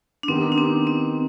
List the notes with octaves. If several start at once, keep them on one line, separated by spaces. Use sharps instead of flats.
D4
D#3 B3 C4 D#4 G4
D4
C4
C4